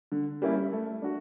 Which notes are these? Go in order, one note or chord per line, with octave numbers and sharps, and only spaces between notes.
D3
G3 A#3 C#4 E4
A3
D4 F#4